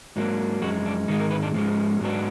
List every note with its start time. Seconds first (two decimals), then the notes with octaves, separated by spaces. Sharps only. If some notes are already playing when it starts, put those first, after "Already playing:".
0.16 G#2 F#3 A#3 D4
0.62 F#2 F3 G#3 F#4
0.85 D4
1.08 G#2 D#3 G#3 D#4
1.20 A#4
1.31 B4
1.43 D4
1.54 G#2 F3 G#3
2.00 G#2 F#3 B3 D4